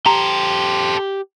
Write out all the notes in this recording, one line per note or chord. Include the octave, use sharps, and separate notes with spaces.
G4 A4 C5 A#5